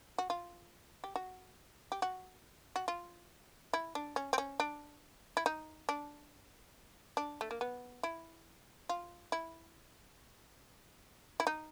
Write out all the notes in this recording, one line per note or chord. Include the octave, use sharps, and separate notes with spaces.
F#4
F4
G4
F#4
G4
F#4
F#4
F4
E4
D4
C#4
C4
C#4
D4
E4
D#4
D4
D4
A3
A#3
B3
E4
F4
E4
E4
D#4